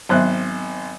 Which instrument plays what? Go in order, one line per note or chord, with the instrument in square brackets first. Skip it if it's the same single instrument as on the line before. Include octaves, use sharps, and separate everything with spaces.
[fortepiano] G#1 C5 F#6 [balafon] F#3 B3 E5